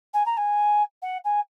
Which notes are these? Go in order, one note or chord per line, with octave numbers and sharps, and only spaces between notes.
G#5
A#5
G#5
F#5
G#5